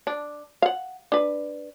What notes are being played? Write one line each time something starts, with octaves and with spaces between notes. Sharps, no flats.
D4
F5 F#5
D4 B4